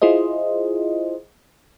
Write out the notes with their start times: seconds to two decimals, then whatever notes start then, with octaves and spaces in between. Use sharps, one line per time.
0.02 E4 F4 G#4 C5 D#5